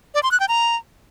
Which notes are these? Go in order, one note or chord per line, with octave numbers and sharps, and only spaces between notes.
D5
C6
F#6
G5
A#5